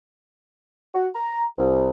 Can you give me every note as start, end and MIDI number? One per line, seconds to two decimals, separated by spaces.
0.94 1.07 66
1.15 1.44 82
1.58 1.90 36